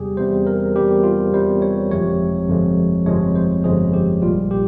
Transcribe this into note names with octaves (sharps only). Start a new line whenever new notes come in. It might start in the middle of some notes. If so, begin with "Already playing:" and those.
Already playing: E2 C3 G3 G4 G#4
E2 C3 G3 C5
A#4
E2 C3 G3 G4
F4
E2 C3 G3 C5
C#5
G1 F2 C3 F3 G#3 C#5
G1 F2 C3 F3 G#3
G1 F2 C3 F3 G#3 C#5
C5
G1 F2 C3 F3 G#3 G#4
G4
A#1 A#2 G3 F4
G4